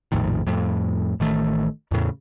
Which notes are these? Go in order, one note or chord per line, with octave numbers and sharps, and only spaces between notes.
A#1 F2 A2 D#3
F2 A2
A1 D#3 A3
E2 A2 C#3